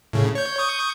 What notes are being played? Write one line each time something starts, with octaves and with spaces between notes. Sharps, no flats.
A2 C#3
C#5 G6
C#6 D#6 G6